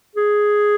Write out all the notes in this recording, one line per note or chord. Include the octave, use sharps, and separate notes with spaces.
G#4